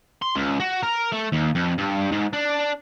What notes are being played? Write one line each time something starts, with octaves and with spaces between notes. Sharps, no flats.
C6
C#2
F#4
A#4
A3
D#2
F2
G2
G#2
D4